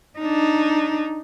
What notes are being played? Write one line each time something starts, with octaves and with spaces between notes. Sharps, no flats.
D4 D#4